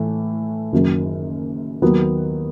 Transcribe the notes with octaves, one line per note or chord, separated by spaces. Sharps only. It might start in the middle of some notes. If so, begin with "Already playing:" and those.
Already playing: A2 E3 A3
F#1 F#2 D#3 F#3
D#2 D#3 F#3 B3